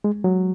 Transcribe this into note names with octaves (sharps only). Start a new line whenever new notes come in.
G#3
F#3